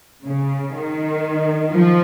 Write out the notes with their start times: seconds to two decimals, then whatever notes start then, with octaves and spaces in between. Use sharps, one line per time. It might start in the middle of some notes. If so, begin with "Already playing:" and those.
0.24 C#3
0.74 D#3
1.72 F3